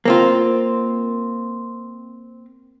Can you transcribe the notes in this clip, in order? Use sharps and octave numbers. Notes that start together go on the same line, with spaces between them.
A#3 C4 F4